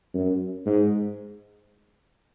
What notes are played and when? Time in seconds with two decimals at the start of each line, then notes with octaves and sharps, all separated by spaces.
0.14 F#2
0.66 G#2